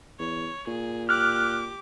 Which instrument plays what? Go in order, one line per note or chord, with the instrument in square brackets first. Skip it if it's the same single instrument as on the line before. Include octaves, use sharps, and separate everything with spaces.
[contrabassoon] E2 [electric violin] C#5
[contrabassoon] A#2 [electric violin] G#4
[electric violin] G4 D6 [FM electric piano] F6 F#6